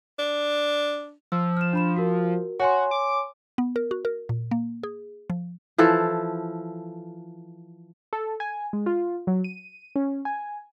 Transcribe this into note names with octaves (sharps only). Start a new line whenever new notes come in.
D4
F3 E6
F6 E7
D4 B5 E7
F#4 A#4
F#4 C#5 G#5 C6
D6
B3
A#4
F#4
A#4
A#2
A#3
G#4
F3
E3 F3 A4
A4
G#5
G#3
F4
F#3
D#7
C#4
G#5